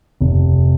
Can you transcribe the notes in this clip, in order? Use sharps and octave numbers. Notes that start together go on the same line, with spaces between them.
F1